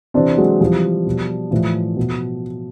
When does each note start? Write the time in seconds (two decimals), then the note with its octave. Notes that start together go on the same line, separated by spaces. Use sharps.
0.14 C3 E3 C4 D4
0.38 F#3 G#3
0.60 C3 E3 F3 G3
1.06 B2
1.51 A2 E3 F3
1.97 B2